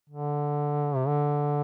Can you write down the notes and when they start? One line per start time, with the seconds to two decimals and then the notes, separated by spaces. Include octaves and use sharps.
0.09 D3
0.95 C3
1.07 D3